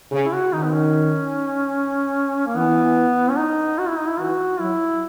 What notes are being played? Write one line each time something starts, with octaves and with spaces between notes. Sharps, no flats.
C#3
E4
F#4
D#3 D#4
B3
C#4
A#3
E3 B3
C#4
D#4
F#4
E4
D#4
E4
E3 F#4
F#3 E4